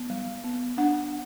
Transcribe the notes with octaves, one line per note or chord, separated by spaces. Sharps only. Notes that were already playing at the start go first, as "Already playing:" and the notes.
Already playing: B3
G3
B3
D4 F#5